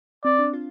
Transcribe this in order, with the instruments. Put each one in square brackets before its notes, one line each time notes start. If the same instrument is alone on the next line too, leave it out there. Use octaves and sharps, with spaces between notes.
[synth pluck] C4 [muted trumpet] D5
[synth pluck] D4
F4